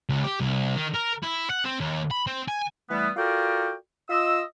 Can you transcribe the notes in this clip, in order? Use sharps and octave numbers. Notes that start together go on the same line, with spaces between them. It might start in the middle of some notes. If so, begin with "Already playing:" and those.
C#2
G4
C2
D#3
A#4
E4
F#5
C4
D#2
B5
C4
G#5
E3 G3 A3 B3
F4 F#4 A4 A#4 D5 G5
F4 D#5 E6